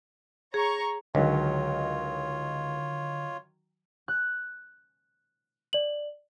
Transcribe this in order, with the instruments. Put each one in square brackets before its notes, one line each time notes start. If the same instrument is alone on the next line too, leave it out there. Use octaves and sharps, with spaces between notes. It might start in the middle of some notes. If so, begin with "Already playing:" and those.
[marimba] G#4 [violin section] C#5 A#5 C#6
[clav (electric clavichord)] C#2 [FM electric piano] D3 [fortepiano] D#3 F#3 [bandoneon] F4 C#5
[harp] F#6
[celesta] D5 F#7